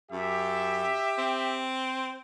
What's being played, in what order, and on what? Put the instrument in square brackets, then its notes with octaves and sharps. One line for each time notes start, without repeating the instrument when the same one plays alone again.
[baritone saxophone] F#2 [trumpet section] G4 E5
[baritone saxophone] C4